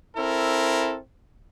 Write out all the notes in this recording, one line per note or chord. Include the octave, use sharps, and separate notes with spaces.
C4 E4 A4 A#4